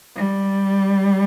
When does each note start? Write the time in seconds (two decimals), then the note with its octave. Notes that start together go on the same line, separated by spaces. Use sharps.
0.16 G3